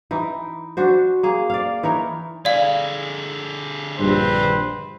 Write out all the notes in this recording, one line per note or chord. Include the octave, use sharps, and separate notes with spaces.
E3 D#4
D4 F#4 C5
A#3 G#4
D5 F5
E3 D#4 A#4 C#5
D3 G#4 D5 F5
A#1 G2 C4 B4 C5